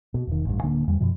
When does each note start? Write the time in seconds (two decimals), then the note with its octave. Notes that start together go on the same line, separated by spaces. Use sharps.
0.14 B2
0.27 E1 D#3
0.45 A1 G2
0.63 D1 D3 A#3 D4
0.87 E2 G3
1.00 F#2 B2 F3